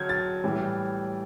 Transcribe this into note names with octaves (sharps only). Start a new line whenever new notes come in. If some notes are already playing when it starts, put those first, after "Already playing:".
Already playing: D3 F#3 F6 G6 G#6
A6
A2 E3 G3